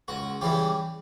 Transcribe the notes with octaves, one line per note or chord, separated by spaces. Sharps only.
C#2 F#4
C#3 E3 G3 G4